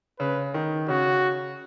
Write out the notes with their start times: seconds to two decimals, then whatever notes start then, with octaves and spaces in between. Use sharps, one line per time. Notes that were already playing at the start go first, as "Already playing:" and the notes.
0.19 C#3 B4
0.54 D#3
0.88 C#3 F#4